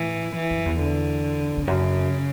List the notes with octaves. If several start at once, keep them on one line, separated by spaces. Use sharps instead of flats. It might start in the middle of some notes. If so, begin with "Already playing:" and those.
Already playing: A2 E3
E3
F#2
E2
D3
E2
F#2 C#3